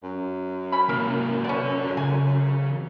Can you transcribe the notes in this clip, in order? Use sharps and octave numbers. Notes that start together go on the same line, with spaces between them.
F#2
C#4 B5
C3 A#3 A#4
B3 C#4 A4 D5
C#3 G#4 G#5